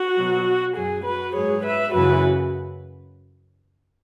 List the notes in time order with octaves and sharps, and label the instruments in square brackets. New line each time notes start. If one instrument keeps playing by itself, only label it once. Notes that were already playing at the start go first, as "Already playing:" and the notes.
Already playing: [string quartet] F#4
B2 F#3
F#2 F#3 G#4
F#4 B4
G#2 F#3 G#4 C#5
B4 E5
F#2 C#3 E3 F#4 B4